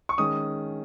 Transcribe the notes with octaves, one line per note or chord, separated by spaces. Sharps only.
C#6
D#3 G#3 C#4 D#6